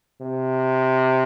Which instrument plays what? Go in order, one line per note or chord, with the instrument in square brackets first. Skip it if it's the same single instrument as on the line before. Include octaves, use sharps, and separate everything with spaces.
[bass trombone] C3